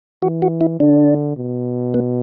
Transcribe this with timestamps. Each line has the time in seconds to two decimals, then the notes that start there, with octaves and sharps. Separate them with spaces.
0.22 E3 F#4
0.42 F#4
0.61 E4
0.80 D3 D4
1.37 B2
1.94 B3